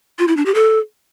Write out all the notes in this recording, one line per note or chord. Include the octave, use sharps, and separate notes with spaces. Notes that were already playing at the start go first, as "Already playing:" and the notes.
F4
E4
D4
G4
A4